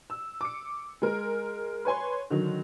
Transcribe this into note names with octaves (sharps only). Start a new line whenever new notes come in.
E6
D6 C#7
G#3 A#4
B4 C#5 G#5 C6
D3 D#3 F#3